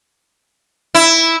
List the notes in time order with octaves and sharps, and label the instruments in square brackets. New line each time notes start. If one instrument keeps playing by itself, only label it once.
[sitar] E4